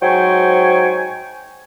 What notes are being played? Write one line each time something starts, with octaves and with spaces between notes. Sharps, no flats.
G#2 F#3 C5 G5 G#5 C#6